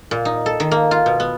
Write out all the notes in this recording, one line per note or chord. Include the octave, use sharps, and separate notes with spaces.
A#2
D#4
A4
D#3
A#3
F4
B2
B3